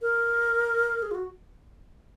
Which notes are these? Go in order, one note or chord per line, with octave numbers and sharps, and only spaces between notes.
A#4
G#4
F4
F#4